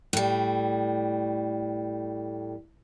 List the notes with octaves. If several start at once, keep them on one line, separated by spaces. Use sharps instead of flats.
A2 G3